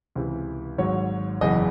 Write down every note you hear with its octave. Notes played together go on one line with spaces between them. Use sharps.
C#2 C3 E3
G#1 G#2 F#3 C#5
F#1 E2 C#3 E3 D#5